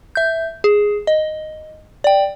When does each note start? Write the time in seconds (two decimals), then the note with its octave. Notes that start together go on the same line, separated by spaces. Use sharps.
0.15 E5 G6
0.64 G#4
1.07 D#5
2.04 D5 G5